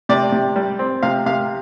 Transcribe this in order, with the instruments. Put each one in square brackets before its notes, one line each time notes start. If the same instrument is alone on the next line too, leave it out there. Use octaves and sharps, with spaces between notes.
[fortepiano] C3 D5
C3
G3
C4
C3 F5
C3 F5